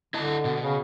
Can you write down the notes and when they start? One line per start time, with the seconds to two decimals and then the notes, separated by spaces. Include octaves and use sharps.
0.14 D3 E4 D#5 A5
0.45 B2
0.62 C#3